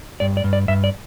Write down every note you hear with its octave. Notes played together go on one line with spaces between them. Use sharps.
G2 D5
D5
G2
D5
G2 E5
D5